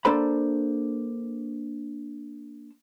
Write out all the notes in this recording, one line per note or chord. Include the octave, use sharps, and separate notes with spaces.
A#3 D4 A4 C5 B5